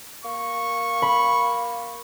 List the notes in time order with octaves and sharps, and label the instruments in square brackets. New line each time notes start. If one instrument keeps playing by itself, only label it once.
[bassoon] A#3 [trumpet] C#6
[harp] B5